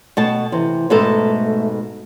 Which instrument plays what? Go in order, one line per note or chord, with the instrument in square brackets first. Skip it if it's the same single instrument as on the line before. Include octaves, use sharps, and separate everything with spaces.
[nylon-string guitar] B2 A3 A5
[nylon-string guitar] C3 [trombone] E3
[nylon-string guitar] G#2 B2 A4 [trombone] A3